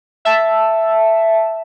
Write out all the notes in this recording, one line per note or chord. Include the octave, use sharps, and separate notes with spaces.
E5 A5